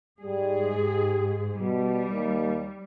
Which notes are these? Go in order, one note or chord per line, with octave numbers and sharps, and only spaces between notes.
G#2 G3 G#4
G4
B2 G3
D#2